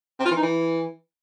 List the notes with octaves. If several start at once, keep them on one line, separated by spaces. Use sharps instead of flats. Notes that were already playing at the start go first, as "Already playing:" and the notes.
C4
F4
E3
D#4
E3